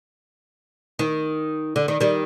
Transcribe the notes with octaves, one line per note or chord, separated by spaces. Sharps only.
D#3
D3
D#3
D#3 G3